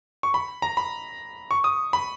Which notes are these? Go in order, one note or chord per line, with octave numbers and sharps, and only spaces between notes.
C#6
B5
A#5
B5
C#6
D#6
B5